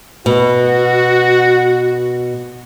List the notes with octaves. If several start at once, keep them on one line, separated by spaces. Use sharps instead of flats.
B2 F#4